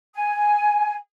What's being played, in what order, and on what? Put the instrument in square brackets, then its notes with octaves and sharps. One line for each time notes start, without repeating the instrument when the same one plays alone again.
[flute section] G#5